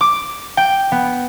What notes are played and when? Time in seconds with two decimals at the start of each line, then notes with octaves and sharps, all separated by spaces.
0.01 D6
0.57 G5
0.92 B3